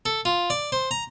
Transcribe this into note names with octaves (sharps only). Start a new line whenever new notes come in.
A4
F4
D5
C5
A#5